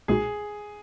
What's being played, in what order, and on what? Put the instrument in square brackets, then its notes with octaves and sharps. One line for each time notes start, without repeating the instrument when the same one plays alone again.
[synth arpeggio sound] B1 A#2 G#3 D#4 F#4 [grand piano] G#4